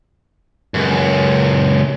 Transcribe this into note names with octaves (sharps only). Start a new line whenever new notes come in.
C#2 F#2